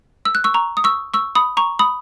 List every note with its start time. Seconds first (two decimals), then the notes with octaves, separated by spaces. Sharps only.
0.25 E6
0.35 F#6
0.44 C#6 E6
0.54 A#5 C#6
0.77 D#6
0.84 C#6 E6
1.14 C#6 E6
1.35 B5 D#6
1.57 A#5 C#6
1.79 B5 D#6